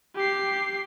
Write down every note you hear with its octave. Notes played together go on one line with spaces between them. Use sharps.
G4 C7